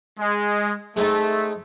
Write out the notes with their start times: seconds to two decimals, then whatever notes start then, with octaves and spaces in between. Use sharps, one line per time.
0.19 G#3
0.96 G#3 A3 C4 D#4